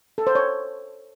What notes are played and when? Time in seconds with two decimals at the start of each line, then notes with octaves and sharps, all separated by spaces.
0.18 A4
0.27 C5
0.35 C#5